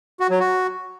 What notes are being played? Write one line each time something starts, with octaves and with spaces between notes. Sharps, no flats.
F#4
F#3
F#4